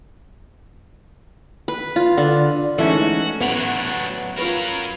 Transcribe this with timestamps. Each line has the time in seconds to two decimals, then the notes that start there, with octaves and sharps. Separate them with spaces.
1.68 B4
1.96 F4
2.17 D3
2.79 E3 G#3 A3 C#4 D#4 F#4
3.41 A1 F#3 B3 D4 F#5 F7
4.37 F#3 F4 A#4 B4